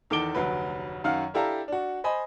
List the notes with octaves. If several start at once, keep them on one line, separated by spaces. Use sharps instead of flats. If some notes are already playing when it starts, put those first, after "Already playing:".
E2 D#3 A4 D6 D7 G7
F1 D2 F#3 B4
F#2 D#3 F5 F#5 F6
D4 E4 G4 A4 F5 A#5
D4 F#4
C5 D#5 G#5 B5